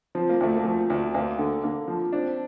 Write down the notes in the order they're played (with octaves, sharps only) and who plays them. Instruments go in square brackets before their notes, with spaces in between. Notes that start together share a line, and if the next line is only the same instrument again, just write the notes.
[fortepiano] F3 [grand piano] C4
[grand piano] A#3
[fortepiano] D2 [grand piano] A3
[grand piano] A#3
[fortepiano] F3
D2
[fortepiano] D2 [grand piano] A#3
[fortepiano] D3
[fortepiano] D3 [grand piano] A#3
[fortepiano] F3
[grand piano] C4 [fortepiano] D4